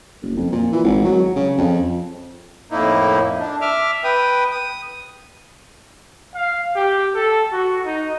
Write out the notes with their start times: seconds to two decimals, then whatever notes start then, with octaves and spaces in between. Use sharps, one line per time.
0.22 F#1
0.36 F2
0.52 A#2
0.72 E3
0.84 G#1
1.05 F#3
1.36 C#3
1.58 F2
2.70 F2 A2 A#3 D#4 E4
3.40 D4
3.61 E5 D6 F6
4.04 B4 G5 D#6
4.51 D#6
6.35 F5
6.76 G4
7.15 A4
7.52 F#4
7.86 D#4